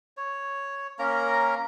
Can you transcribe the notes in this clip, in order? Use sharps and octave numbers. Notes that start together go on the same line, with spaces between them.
C#5
A#3 C#4 A#4 A#5